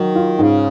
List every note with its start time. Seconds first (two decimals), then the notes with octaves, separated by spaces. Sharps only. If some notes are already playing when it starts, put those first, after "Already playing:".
Already playing: D#3 F#3
0.15 F4
0.39 G#2 C#3